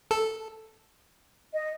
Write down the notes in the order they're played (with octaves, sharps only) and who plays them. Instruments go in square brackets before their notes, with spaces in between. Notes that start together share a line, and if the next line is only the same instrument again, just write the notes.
[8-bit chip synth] A4
[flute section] D#5